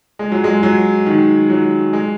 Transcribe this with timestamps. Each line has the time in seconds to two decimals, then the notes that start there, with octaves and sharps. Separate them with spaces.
0.19 G#3
0.32 F#3
0.44 G#3
0.63 F#3
1.06 D#3
1.50 F#3
1.93 G#3